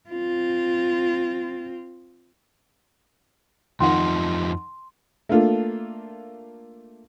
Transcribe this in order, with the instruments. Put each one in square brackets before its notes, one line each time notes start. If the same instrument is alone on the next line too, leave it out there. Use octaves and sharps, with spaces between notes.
[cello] C4 F4
[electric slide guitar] F2 F3 D#4 [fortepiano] D#3 F#5 [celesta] C6
[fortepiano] A3 A#3 D4 F4 A4